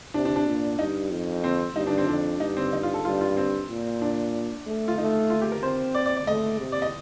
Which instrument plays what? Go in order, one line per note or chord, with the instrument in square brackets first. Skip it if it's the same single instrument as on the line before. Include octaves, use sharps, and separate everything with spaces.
[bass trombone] C3 [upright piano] D4
[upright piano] D4
D4
[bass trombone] A#2
[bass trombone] G2 [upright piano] D#4
[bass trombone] F2
[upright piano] C4
[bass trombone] G2 [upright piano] D#4
[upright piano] D4
C4
[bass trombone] F2 [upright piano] D4
[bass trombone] G2 [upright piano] D#4
[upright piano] C4
D#4
F4
A4
[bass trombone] G2 [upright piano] F4
[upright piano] F4
C4
[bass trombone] A#2
[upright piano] D4
[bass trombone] A3
[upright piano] F4
[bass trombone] A3 [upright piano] D#4
[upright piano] F4
G4
A#4
[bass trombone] C4 [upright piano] C5
[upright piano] D5
D5
D5
[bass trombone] A3 [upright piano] D#5
[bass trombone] C3
[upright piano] D5
D#5